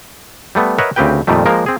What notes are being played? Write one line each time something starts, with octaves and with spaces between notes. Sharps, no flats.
G3 A3 B3
A#4 B4 C#5 D#5 E5 F#5
D2 C#3 C4 G4 B4 G5
F2 A#2 D#3 G3 A3
F3 G#3 A#3 A#4
C4 G#4